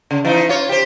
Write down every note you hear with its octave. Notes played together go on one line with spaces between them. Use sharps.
C#3
E3 D#4
F4 C#5
G4 C5